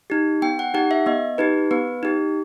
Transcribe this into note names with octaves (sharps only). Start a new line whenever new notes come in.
D#4 G4
B3 G5
F#5
D#4 G4 F#5
E5
B3 D#5
D#4 G4 B4
B3 B4
D#4 G4